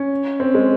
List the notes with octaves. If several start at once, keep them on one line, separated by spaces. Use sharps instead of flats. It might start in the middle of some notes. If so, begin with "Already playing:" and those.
Already playing: C#4
C4
G#3